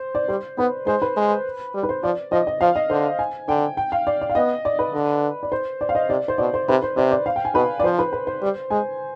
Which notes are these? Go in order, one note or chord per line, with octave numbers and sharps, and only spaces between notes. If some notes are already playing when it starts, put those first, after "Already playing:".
Already playing: C5
D5
G3 C5
B3 B4
G#3 C5
B4
G#3
G3
B4
C5
F3 D5
F3 D#5
D#5
F3 F5
D#5
D3 C5
G#5
D3 G5
G5
F5
D5
D5
F5
B3 D#5
D5
B4
D3
D5
C5
D5
F5
D#5
C3 D5
C5
B2 D5
C5
C3 B4
C5
C3 D5
D5
F5
G5
G#5
B2 B4
D5
F3 C5
B4
B4
C5
G3
G#3 G#5